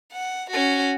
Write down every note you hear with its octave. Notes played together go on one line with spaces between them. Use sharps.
F#5
C#4 F#4